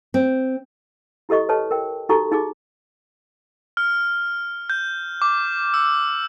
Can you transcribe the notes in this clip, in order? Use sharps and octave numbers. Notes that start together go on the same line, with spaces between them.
C4
E4 G4 A4 D#5 C#6
A4 B4 C#5 A5
A#4 G5
D#4 F#4 G4 A4 A#5 C#6
D#4 G#4 D6
F6
G6
D6
E6